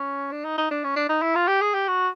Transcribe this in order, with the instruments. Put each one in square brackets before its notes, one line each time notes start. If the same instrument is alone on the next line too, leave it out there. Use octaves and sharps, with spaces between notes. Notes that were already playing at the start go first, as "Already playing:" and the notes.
Already playing: [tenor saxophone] C#4
D4
D#4
D#4
D4
C#4
D4
D#4
E4
F4
G4
G#4
G4
F#4